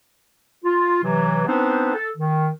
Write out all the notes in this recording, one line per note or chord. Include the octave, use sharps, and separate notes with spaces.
F4
C3 E3 F#3
B3 C4 D4 D#4 B4 C5
A4
D#3